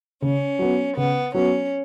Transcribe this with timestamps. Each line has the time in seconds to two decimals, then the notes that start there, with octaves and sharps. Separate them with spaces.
0.22 C#3 C#4
0.59 F#3 B3
0.97 C#3 B3
1.34 F#3 B3 C#4